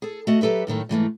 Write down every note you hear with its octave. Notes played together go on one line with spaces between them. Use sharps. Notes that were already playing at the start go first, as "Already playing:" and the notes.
G#4 A4
A3 F#4 D#5
F#3 G4 A4 B4 E5
F#2 A2 D#3 A3
G#2 E3 A3 A#3